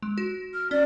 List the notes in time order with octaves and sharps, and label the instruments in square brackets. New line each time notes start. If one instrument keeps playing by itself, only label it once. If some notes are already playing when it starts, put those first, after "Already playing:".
[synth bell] G#3
F#4
[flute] F6
[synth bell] C#4 [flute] D5